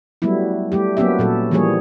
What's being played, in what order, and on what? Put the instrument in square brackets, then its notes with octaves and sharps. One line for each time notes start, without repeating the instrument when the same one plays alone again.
[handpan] F#3 G3 A3 B3 E4
G3 A3 G4
F#3 A#3 B3 C#4 G4 E5
A#2 F#3 A4
E3 F3 G3 A#3 G#4 C#5